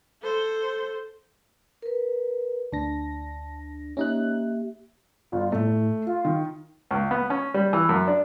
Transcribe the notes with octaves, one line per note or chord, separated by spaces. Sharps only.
A4 C5
A#4 B4
D2 D4 A5 A#6
A#3 C#4 D#4 G4 E5 F#6
G1 F4
A2 A3
F4
D#3
C#2
B3
C#4
G3
E3
F#2
D4